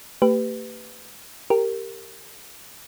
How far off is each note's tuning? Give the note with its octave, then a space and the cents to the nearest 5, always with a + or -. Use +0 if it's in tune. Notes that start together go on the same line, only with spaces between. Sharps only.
A3 +45 G4 +0 B4 +15
G4 +5 A#4 -15